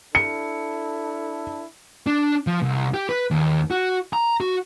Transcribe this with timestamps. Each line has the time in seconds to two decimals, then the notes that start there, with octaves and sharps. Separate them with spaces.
0.15 D4 E4 A4 C#7
2.07 D4
2.47 F3
2.62 C2
2.94 G4
3.09 B4
3.31 D#2
3.71 F#4
4.13 A#5
4.40 F#4